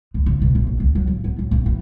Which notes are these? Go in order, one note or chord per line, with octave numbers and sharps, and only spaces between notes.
D2
C#3
B2
A#1
A#1
D2
F#3
A1
B3
A2
A#1
E3